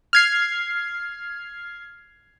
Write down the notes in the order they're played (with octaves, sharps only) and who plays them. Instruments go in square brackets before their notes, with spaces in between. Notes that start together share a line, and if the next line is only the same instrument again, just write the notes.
[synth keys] F6 G#6 C7